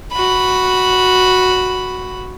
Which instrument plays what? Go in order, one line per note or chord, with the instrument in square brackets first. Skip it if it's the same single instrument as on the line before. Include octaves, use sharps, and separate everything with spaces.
[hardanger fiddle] F#4 B5